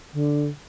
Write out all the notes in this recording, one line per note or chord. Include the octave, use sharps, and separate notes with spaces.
D3